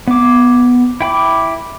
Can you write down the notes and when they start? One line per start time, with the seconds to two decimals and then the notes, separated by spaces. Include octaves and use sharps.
0.08 B3 D6
1.01 E4 G5 B5 D6